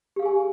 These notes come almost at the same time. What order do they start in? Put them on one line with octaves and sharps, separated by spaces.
G4 F5 G#4 G#5